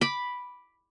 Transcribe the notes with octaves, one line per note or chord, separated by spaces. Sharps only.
B5 D6